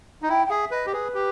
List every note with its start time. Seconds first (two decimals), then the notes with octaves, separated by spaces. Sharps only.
0.22 D#4
0.29 E4 G5
0.45 G5
0.50 G#4 E5
0.71 B4 D#5
0.86 G4
0.93 G#4 B4
1.14 G4